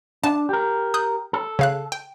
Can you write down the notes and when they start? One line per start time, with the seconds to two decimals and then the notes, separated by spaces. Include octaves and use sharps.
0.24 D4 A5
0.49 G4 A#4
0.94 D#6 F#6 G6
1.33 A4
1.59 C#3 F5 F#6
1.92 G5